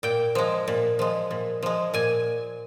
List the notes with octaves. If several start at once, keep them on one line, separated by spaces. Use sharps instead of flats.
A#2 G5
F3 G#3
A#2
F3 G#3
A#2
F3 G#3
A#2 G#5